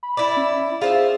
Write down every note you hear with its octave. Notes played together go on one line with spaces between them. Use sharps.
B5
E4 D5
C#4
F4 G#4 C5 E5